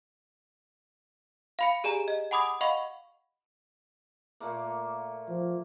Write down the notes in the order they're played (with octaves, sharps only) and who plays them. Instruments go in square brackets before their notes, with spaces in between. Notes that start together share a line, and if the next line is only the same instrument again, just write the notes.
[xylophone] F5 B5 C#7
G4 G#4 D5 G#5 A#5
D#5
F#5 G#5 B5 D6 D#6 G#6
D#5 F5 F#5 B5 C#6
[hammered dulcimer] A#2 A3 A#3
[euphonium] F3